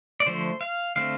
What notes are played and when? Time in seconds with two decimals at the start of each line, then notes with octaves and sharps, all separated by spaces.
0.20 D5
0.26 D3 F3 A3 C5
0.61 F5
0.96 D3 A3 C4 F5